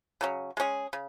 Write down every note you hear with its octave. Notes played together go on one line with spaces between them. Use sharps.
C#3 F#3 C#4
G#3 C#4 G#4
C#3